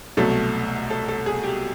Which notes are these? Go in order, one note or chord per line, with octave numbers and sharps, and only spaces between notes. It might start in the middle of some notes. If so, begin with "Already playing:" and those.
C2 B2 F#3 A3 A4
A4
A4
G#4
G4